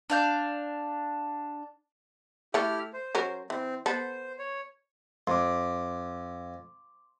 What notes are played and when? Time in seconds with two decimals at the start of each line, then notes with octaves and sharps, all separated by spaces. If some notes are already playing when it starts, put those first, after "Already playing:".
0.10 D4 F5 G6
2.54 A3 E4 G4 A4 F6
2.93 C5
3.15 F#3 C#4 A#4
3.50 E3 C4
3.86 B3 A4 C5
4.39 C#5
5.27 F2 C6 D6